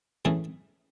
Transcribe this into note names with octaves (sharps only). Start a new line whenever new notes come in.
A2 E3 A3 C#4 G#4